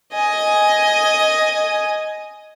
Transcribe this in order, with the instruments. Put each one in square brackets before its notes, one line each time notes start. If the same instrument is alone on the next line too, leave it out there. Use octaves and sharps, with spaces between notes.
[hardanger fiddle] D#5 G#5